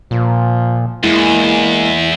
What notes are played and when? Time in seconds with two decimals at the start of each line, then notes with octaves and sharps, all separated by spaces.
0.11 A#2 F3
1.03 E2 G#3 A#3 E4